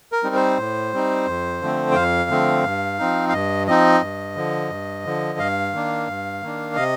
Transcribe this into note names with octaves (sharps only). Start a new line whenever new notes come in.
A#4
G3 C4 D#4
C5
A2
G3 C4 D#4
F2
D3 F3 A3 C4
G5
F2 F5
D3 F3 A3 C4
G2
F3 C4 D#4
F5
G2 D#5
F3 C4 D#4 D#5
G2
D3 F3
G2
D3 F3
G2 F5
D#3 A#3 D4
G2
D#3 A#3 D4
C3 D#5